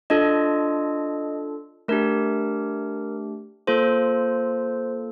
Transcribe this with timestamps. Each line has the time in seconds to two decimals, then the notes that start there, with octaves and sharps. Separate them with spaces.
0.10 D4 F4 A4 D#5
1.88 A3 D4 G4 A#4
3.67 A#3 F4 A4 C5